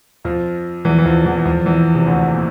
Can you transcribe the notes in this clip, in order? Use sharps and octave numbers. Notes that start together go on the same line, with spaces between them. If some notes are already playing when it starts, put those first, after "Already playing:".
F2 F3
E2 E3
E3
F2 F3
E2 E3
E3
F2 F3
E2 E3
C3
D2 D3
A#2